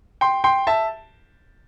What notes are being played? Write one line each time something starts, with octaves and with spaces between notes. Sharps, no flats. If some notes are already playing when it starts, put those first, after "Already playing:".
G5 C6
G5 C6
E5 A5